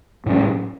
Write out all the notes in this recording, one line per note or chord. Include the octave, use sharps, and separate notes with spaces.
A2 F#3 C#4